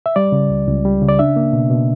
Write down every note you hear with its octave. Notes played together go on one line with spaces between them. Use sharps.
E5
G3 D5
C#3
C#2
C#2
G3
C#3
D5
D4 E5
A#3
B2
B2